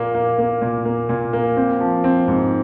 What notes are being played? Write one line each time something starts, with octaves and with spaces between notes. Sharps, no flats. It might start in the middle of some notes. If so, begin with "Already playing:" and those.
Already playing: A#2 A#3
A#3
A#3
A#2
A#3
A#2
A#3
C4
F3
C4
G#2